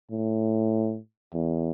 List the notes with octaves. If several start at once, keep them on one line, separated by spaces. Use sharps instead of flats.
A2
E2